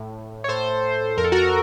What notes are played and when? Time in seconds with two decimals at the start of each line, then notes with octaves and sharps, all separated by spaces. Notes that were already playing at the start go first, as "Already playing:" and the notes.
Already playing: A2
0.44 C#5
0.48 A2 A4 C5
1.17 F2 A#4
1.24 A4
1.32 F#4 A#4